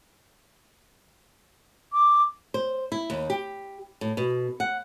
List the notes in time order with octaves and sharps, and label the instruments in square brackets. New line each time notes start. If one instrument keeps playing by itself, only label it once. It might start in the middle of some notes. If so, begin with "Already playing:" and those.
[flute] D6
[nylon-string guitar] C5
E4
D#2
G4
A2
B2
F#5